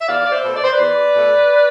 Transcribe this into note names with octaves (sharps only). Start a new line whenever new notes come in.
E5
E2 D5 F5
D5
C5 E5
B2 A3
D5
C5
B4 D5
E2
B2 A3